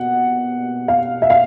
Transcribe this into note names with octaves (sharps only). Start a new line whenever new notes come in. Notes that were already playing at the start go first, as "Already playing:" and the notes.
Already playing: B2 F#5
F5
E5
F5